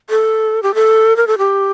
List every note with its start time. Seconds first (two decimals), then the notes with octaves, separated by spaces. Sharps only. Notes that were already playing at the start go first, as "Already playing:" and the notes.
0.10 A4
0.63 G4
0.75 A4
1.17 A#4
1.27 A4
1.38 G4